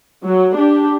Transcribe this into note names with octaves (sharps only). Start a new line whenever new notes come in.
F#3
D4 G4